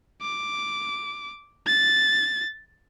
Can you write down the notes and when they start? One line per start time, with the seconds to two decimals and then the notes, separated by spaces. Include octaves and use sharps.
0.22 D6
1.67 A6